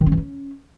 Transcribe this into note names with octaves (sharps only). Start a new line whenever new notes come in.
D#3
C#4
E3
C#4